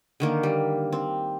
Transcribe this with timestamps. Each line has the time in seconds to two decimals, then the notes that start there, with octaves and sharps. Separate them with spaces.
0.20 D3 D#3 A#3
0.43 G3
0.93 C4